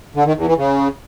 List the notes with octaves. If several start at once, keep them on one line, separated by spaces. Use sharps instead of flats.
D3
D#3
E2
E3
C#3